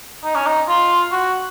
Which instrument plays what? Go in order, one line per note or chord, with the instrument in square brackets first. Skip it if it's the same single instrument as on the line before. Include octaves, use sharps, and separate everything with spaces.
[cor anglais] D#4
C#4
D#4
F4
F#4